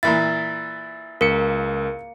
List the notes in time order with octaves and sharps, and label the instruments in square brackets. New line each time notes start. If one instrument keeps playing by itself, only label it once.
[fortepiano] A#2 E3 E4 [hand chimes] A6
[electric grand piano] C#2 C#7 [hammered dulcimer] A#3 [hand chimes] A#4